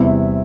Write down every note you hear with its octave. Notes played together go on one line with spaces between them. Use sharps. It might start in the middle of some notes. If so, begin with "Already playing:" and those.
Already playing: E2 C3 G3 E4